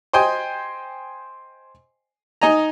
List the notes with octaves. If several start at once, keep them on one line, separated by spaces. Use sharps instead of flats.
C5 D#5 G5 G#5 C6
D#4 D#5 G#5 A#5